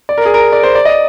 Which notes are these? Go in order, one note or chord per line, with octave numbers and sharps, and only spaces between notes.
D5
A#4
G#4
A#4
D5
C5
D5
D#5